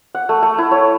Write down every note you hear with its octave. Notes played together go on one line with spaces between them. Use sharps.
F#5
A3
A3
E4
C#5